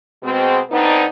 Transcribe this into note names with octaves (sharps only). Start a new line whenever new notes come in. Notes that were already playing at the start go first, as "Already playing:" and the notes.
B2 G#3 C4
D3 B3 C4 D4 D#4